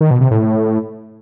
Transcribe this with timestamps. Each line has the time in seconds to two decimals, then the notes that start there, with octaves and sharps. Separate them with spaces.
0.01 D#3
0.11 B2
0.21 C3
0.31 A2